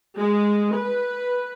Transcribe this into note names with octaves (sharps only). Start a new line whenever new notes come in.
G#3
B4